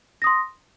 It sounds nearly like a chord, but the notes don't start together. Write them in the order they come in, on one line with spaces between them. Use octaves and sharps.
A#6 D#6 C6